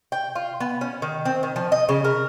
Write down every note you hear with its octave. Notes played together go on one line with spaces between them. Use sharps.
G5
F4
B3
C#4
D#3
C4
D#3
F3
D#5
C#3
A#4